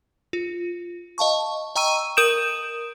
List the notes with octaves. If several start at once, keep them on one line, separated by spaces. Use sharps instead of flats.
F4
D#5 F5 A5 C#6
D#5 G5 A#5 C#6 E6 D#7
A#4 D#6 G6 D7 E7